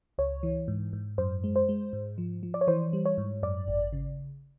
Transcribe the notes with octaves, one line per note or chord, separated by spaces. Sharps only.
C#2 C#5
E3
G#2
G#2
F#2 C5
G#3
C5
G#3
G#2
F3
F3
D5
C#5
E3 C5
G3
C#5
G#2
F#2 D5
G#1
C#3